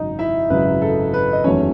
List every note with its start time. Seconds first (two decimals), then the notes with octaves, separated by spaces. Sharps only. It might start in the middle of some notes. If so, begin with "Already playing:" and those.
Already playing: G#1 F#2 C#3 D#4 D#5
0.19 E4 E5
0.49 G#1 F#2 C#3 B4
0.82 A4
1.14 B4
1.33 D#5
1.44 F#1 E2 D#3 F#3 A3 C#4 C#5